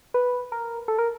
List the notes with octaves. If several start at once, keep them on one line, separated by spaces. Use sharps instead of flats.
B4
A#4
A4
A#4